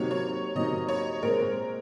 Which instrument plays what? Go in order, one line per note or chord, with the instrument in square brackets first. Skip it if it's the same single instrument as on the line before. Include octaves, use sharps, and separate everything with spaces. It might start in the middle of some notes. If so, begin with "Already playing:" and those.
Already playing: [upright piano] C3 F#3 A#3 D#4 [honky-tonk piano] C#5
[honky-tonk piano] C#5
[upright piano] C3 F#3 A#3 D#4 [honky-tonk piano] D#5
[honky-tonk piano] C#5
[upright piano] A#2 G#3 C4 [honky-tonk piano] A#4